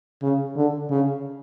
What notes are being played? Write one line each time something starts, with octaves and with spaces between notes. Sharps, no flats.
C#3
D3
C#3